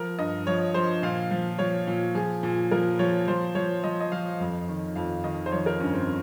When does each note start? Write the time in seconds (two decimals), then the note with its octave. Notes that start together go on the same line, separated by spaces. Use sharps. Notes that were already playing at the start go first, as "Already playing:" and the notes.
Already playing: F3 A#4
0.19 G2 D#5
0.47 F3 C#5
0.74 F3 C5
1.03 A#2 F5
1.31 F3
1.58 F3 C#5
1.87 A#2
2.15 F3 G#4
2.43 A#2
2.71 F3 A#4
2.99 F3 C#5
3.28 F3 C5
3.55 F3 C#5
3.84 F3 D#5
4.01 D#5
4.12 F3 F5
4.40 F2
4.68 D#3
4.96 F2 F5
5.24 D#3 D#5
5.46 C5
5.52 F3 C#5
5.66 A#4
5.80 G2 C#4
5.94 C4